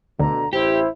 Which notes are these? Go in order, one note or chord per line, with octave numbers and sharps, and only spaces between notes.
D2 B2 D3 A#5
A1 E4 G4 C5